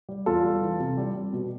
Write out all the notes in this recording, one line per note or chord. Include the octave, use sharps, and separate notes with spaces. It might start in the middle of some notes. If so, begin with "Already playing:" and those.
G3
E2 F4 A4
G3
E3
C3
G3
G3
B2